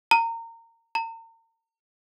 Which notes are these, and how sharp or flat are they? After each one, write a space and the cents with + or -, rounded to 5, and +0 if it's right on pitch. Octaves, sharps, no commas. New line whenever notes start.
A#5 -25
A#5 -40